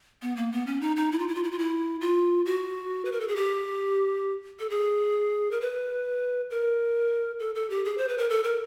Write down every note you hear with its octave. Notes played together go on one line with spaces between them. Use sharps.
B3
A#3
B3
C#4
D#4
D#4
E4
F4
E4
F4
E4
F4
E4
F4
F#4
B4
A#4
A4
G#4
G4
A4
G#4
A#4
B4
A#4
A4
A4
G4
G#4
C5
B4
A#4
A4
A#4